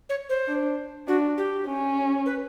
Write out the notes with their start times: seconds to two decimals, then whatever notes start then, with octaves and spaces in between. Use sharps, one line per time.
0.09 C#5
0.29 C5
0.48 D4
1.08 D4 F#4
1.38 G4
1.66 C#4
2.26 B4